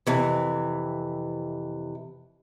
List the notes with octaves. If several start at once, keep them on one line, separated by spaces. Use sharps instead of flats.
F2 C3 E3